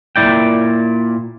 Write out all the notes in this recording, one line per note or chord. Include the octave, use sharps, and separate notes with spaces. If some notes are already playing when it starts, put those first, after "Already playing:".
A#2 E4 D5 G5